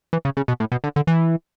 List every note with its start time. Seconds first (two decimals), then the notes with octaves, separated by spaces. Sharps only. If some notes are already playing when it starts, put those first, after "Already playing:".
0.13 E3
0.25 C#3
0.37 C#3
0.48 B2
0.60 A2
0.72 B2
0.84 D3
0.96 D3
1.07 E3